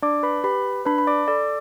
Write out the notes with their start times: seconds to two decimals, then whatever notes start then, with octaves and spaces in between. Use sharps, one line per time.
0.02 D4 D5 D6
0.23 B4 B5
0.44 G4 B4 B5
0.85 D4 B4 B5
0.98 B5
1.07 D5 D6
1.28 A4 D5 D6